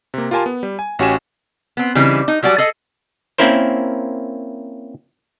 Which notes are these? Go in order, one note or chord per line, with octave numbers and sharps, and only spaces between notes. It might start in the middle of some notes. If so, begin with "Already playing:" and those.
C3 A#3
F4 G4 A#4 G#5 A5 C6
B3
G3
G#5
A1 C#4 F#4 G4 G#5 E7
B3 C4
C#3 E3 G3 C4 D#4
D#4
F#3 G3 F#4 D5 G#5
G#4 A4 D#5
A#3 C4 C#4 E4 A#4 C5